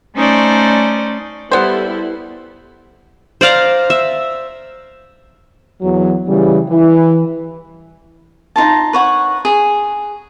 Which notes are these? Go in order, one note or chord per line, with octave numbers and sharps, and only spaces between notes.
A3 C#4 D#4 C5 D5
G3 B3 E4 A4 C5
C5 D5 F5 A#5
E5
E2 F#3
C#3 E3 G3
E3
D#4 F4 A5
B4 C#5 F#5
G#4